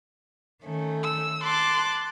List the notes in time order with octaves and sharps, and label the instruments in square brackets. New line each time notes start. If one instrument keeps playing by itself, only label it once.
[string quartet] D#3 A3 C#4
[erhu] E6
[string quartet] A5 D6 F#6 [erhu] C6